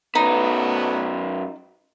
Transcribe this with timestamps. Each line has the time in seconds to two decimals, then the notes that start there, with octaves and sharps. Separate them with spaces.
0.15 F#2 F#3 A3 B3 D#4 B4